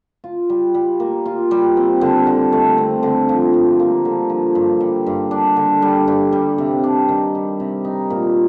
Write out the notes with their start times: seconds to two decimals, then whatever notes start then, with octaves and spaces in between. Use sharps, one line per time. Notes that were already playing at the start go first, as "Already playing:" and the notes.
0.24 F4
0.50 G3
0.74 G3
1.00 A#3
1.26 F4
1.51 G3
1.77 C4
2.01 D3
2.27 D3
2.53 A3
2.78 C4
3.03 D3
3.29 F3
3.54 G2
3.79 A#3
4.05 D3
4.30 F3
4.55 G2
4.81 G3
5.06 G2
5.31 D4
5.56 D3
5.82 G3
6.08 G2
6.32 G3
6.58 C3
6.84 D4
7.09 D#3
7.35 G3
7.60 C3
7.85 D#4
8.10 A#2